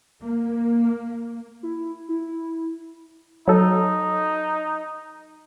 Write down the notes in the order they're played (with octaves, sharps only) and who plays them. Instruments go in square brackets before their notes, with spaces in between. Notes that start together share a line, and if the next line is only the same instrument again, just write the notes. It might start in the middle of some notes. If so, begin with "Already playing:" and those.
[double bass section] A#3
[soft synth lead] E4
E4
[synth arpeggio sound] F#3 A4 [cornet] D#4